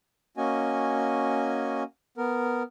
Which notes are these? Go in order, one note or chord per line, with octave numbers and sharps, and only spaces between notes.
A#3 C#4 F#4 D#5 G#5
B3 A#4